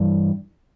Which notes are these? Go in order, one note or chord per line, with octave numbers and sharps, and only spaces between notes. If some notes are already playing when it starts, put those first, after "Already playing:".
Already playing: G2 E3